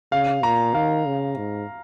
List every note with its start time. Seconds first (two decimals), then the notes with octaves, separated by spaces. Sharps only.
0.12 C#3 F5
0.43 A#2 A#5
0.74 D#3 F5
1.06 C#3
1.37 G#2